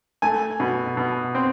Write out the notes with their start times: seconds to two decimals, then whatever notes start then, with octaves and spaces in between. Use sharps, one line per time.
0.22 A3 G#5
0.60 B2
0.97 B2
1.35 C4